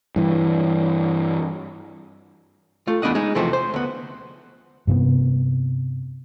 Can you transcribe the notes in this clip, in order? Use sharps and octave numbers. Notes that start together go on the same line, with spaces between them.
G2 E3
A3 F4
E2 A3 B3 D4 D#5 F#5
G#3 D#4
E2 C3 E3 F3 A3 C4
C5
D2 B3
G2 C3 B3